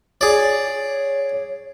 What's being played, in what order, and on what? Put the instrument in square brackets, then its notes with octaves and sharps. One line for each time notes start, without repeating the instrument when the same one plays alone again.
[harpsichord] G#4 D5 [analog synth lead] C#5